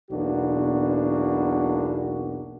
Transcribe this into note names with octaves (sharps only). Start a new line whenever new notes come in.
B1 E2 B2 A#3 D4 F#4